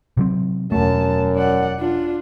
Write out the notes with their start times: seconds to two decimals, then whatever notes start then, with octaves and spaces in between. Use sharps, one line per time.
0.17 C3 F#3 C4
0.72 E1 F#2 A3 A5
1.36 D5 F#5
1.79 D4 F4